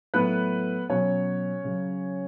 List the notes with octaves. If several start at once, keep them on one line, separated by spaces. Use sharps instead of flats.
A2 F#3 B3 B4
B2 F#3 C#4 C#5
C#3 F#3